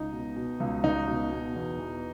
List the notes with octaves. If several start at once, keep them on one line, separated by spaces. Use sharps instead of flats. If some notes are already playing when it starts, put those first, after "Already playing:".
Already playing: C#2 D#4
B2
B2
C#2
C#2 D#4
B2
B2
E2
E3